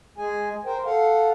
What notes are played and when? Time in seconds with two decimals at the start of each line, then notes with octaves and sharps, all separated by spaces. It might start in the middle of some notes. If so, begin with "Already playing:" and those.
0.18 G#3 G#4 G#5
0.65 A#4 C5 G5
0.85 A4 F5 F#5